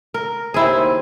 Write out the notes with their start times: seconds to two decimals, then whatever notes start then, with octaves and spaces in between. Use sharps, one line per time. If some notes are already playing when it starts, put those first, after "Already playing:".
0.14 A#4
0.54 D#2 C4 E4 G#4 C5